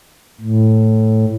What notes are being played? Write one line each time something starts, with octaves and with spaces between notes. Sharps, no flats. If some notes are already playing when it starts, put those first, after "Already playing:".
A2